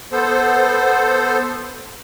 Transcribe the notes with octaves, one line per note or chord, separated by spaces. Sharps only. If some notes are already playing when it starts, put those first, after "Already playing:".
B3 A4 C5